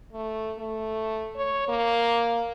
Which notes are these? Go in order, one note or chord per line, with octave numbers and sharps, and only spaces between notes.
A3
A3
C#5
A#3